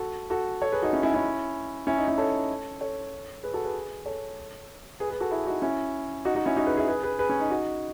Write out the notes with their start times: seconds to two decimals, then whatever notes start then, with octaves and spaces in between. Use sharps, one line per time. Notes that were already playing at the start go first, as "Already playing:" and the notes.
Already playing: F#4 A4
0.30 F#4 A4
0.61 A4 C#5
0.72 G#4 B4
0.82 D#4 F#4
0.92 C#4 E4
1.03 C#4 E4
1.14 C#4 E4
1.87 C#4 E4
1.97 D#4
2.07 C#4 E4
2.18 A4 C#5
2.81 A4 C#5
3.43 G#4 B4
3.53 F#4 A4
3.64 G#4 B4
4.06 A4 C#5
5.00 G#4 B4
5.10 G#4 B4
5.20 F#4 A4
5.31 E4 G#4
5.47 D#4 F#4
5.62 C#4 E4
6.25 D#4 F#4
6.35 D#4 F#4
6.45 C#4 E4
6.57 D#4 F#4
6.66 G#4 B4
6.77 E4 G#4
6.88 G#4 B4
7.03 G#4 B4
7.19 G#4 B4
7.29 C#4
7.40 D#4
7.51 D#4 F#4